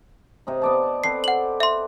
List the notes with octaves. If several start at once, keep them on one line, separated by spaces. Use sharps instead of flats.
C3 C4 D#4
B3 D5 A5
C4 A4 B4 C7
F#5 F#7
E5 C6